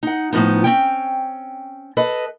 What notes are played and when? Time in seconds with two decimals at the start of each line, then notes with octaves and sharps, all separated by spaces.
0.03 D#4 F#5
0.33 A2 F3 B3 D#4
0.64 C4 C#4 G5
1.97 A4 B4 D#5